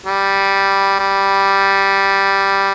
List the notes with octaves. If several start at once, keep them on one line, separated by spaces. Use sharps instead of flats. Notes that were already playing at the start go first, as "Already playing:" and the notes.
G3
G3